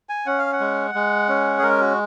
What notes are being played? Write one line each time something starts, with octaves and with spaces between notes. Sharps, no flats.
G#5
C#4 F#5
F5
F#5
G#3
G#3
C#4
G#4
G#3 A#4
F#4